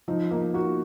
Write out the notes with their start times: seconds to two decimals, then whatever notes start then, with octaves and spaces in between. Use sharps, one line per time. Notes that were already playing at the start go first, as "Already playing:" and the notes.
0.08 F3 D#4
0.30 A#3 D#4
0.54 A#3 F#4